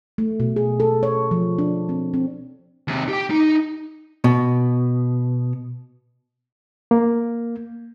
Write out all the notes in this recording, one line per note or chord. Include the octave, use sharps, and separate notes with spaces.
A3
B2
G#4
A4
C#5
F3
D4
C4
C4
D#2 C3
G4 G5
D#4
B2
A#3